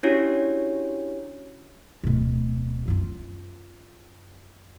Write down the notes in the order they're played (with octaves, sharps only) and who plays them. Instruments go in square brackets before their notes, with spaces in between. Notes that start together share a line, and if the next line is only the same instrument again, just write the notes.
[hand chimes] C#4 D4 E4 F#4 G4 C#5
[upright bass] D1 B2
F#2 F4